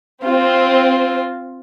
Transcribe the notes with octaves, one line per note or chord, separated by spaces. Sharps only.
C4 F4